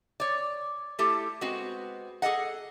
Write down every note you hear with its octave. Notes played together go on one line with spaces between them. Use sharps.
C#5 D5
A3 E4 G4 A4
G#3 B3 C4 F#4
G#4 A4 D#5 F#5